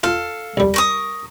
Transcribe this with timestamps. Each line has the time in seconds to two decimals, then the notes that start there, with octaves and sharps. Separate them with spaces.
0.03 F4 A4 F5
0.57 C2 G3
0.74 A#4 C#6 D#6